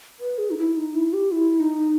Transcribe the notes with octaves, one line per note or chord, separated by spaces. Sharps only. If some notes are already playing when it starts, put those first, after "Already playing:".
B4
G#4
D#4
E4
D#4
E4
G4
E4
D#4